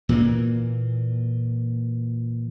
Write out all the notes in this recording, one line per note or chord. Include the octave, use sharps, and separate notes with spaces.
A#2 E3 A#3